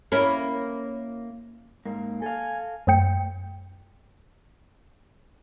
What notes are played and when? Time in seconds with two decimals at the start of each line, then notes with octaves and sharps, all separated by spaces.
0.12 A#3 C#4 E4
1.86 G#2 A#3
2.22 A4 F5 G#5
2.87 F#2 A3 G5 C#7